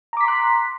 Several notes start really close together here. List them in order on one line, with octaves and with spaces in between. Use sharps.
A#5 D6 B6 C6 F#6